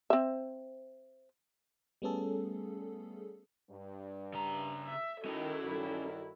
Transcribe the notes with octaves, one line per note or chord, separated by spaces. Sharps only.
C4 E5
G3 A3 B3 C#4 G#4 A4
G2
C#3 A#5
E5
D#3 C#4 E4 F#4 A4 D#5
G2 D#3 F#3